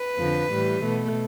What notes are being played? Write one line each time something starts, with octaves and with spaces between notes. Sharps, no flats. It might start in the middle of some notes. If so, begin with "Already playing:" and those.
Already playing: B4
F2 D3 F3
A2 E3 G3
B2 A3